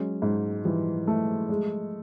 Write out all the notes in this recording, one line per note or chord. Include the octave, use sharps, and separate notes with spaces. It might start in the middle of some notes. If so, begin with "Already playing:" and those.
Already playing: F#3 G#3 C#4
G#2
E3 F3 G3
A3
G#3